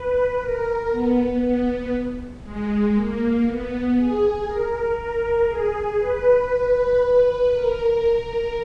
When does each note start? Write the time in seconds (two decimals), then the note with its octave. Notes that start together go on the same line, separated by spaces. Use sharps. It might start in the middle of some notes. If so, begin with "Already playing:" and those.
Already playing: B4
0.41 A#4
0.91 B3
1.41 B3
2.43 G#3
2.94 A#3
3.45 B3
3.96 G#4
4.47 A#4
4.97 A#4
5.48 G#4
5.99 B4
7.51 A#4